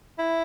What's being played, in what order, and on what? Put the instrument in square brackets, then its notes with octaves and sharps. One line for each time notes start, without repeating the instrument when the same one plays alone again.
[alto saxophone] E4